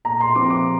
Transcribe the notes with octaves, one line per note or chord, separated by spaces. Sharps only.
A#2 A#5
C6
F3 C4 D6
D6